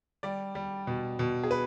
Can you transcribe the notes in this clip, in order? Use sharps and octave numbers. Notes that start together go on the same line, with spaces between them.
G3 D5
G3
B2
B2
G#4
B4